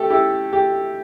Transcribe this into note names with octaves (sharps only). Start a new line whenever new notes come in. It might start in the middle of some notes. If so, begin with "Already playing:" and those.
Already playing: A3 G4 A4
E4 G4
G4